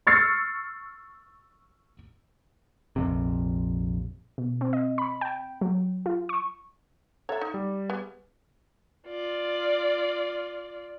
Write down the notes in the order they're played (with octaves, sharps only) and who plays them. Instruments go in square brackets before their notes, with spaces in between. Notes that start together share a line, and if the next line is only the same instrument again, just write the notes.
[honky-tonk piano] C#6 E6 F6 A6 C7 C#7
[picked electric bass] A#1 F2 C3
[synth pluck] B2
C4
D#5
B5
G5
F#3
F4
C#6
[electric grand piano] A4 F#5 A#5 [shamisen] C#5 E5
[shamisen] D#4
[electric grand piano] G3
[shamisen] B3 G#4
[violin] F4 D5